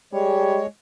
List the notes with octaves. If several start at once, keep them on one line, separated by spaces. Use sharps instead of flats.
G3 G#3 C#5